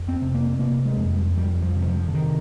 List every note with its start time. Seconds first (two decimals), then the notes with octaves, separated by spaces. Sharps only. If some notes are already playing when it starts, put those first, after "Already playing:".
Already playing: F2
0.08 C4
0.21 C3
0.34 A#3
0.59 C3 A#3
0.85 G#3
0.98 F2
1.11 G3
1.37 F2 G3
1.62 F3
1.76 C3
1.82 G3
1.88 F3
2.08 D3
2.13 C3 D#3